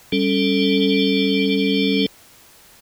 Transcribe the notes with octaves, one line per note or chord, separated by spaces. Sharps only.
G3 C#4 A4